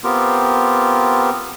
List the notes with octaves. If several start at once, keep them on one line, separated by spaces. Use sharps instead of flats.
B3 C4 F4 G4 A#4